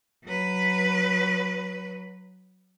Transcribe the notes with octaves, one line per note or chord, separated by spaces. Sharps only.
F#3 B4